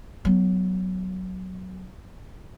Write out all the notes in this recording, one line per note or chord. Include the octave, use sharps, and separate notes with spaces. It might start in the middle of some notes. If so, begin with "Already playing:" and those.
F#3 B3